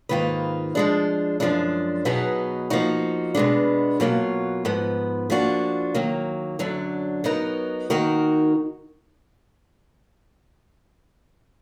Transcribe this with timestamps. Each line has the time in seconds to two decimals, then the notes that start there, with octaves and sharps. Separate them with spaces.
0.09 G#2 D#3 A#3 F4 B4
0.75 F3 G#3 D4
1.40 F#2 F3 G#3 D4
2.05 B2 F#3 B3 D#4 G#4
2.70 F3 A#3 D#4 F#4
3.35 B2 G#3 B3 D4
4.00 B2 F#3 A#3 F4
4.65 G#2 F3 B3
5.30 F3 A#3 D4 F#4
5.95 D#3 F#3 A#3
6.59 F#2 D3 F#3 D4
7.24 F#3 B3 D#4 A#4
7.90 D#3 A#3 D#4 F#4 A#4